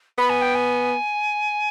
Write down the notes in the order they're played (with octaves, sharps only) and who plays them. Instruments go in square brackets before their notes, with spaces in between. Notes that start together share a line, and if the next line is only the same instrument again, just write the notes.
[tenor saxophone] B3 [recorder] B5
[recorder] G#5
G5
G#5